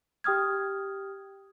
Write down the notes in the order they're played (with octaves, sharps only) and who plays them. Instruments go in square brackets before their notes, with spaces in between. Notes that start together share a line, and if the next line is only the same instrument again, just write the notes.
[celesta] G4 G5 D#6 F6 G#6